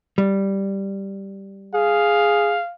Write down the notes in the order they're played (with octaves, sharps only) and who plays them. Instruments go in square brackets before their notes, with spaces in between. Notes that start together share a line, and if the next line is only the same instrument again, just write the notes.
[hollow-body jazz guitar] G3
[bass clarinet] G#4 [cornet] F5